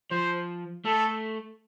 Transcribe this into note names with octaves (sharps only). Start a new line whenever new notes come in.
F3 C5
A3 A4